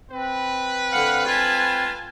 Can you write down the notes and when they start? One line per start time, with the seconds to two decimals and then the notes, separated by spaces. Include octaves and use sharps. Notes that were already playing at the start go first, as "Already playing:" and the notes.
0.11 C4 B4
0.92 D3 F5 F#5
1.26 F4 G#5 A5